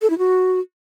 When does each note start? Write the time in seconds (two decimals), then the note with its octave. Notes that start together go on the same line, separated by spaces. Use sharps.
0.02 A4
0.10 E4
0.18 F#4